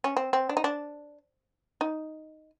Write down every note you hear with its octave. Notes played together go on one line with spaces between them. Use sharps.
C#4
C4
C4
D4
D#4
D4
D#4